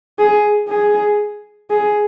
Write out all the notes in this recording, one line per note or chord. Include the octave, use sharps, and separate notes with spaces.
G#4
G#4
G#4